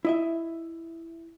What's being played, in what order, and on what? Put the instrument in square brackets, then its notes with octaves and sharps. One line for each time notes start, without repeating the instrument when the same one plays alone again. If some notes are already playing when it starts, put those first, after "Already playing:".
[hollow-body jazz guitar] E4 D#5 E5